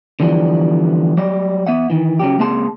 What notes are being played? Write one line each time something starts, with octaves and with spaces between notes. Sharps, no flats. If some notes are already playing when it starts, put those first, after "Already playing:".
D3 E3 F3 G3 B3
F#3 G3 D5 D#5
B3 E5 F#5
D#3 E3
C#3 F#3 G4
C#2 A#3 C4 G#4 A5 C6